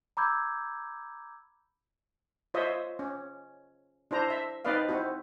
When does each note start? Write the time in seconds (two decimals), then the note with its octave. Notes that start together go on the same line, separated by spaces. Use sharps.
0.17 A#5 B5 D6 E6 G6 G#6
2.54 F4 C5 C#5 D#5 E5
2.99 C#4
4.11 D4 E4 C5 A#5
4.30 E5
4.65 C4 D#4 B4 D5 D#5 F5
4.89 C4 E4 F#4